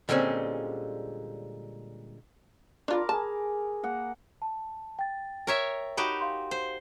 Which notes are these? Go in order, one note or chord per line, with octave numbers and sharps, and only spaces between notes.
A#2 D3 G3 G#3 C4 C#4
D4 F4 A#4 B5 D6
G#4 A#4 A5
A#3 F#5
A5
G5 A6
A#4 C#5 E5
D#4 F#4 G4 B5
F5 C6
C5